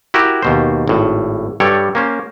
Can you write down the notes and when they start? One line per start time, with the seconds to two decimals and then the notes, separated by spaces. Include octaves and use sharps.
0.14 E4 F#4 G4 A#4
0.42 D#2 B2 C5
0.88 G#1 A2
1.60 G2 G3 A4 C#5 G5
1.95 A#3 C#4 C5